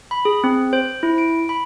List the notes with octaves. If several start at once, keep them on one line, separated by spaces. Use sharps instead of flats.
B5
G#4
C4
C5
E4
D7
B5